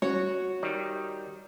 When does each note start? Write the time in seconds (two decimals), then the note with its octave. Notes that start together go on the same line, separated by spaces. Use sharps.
0.02 G3 C#4 F#4 C#5
0.63 D#3 G3 D5 F#6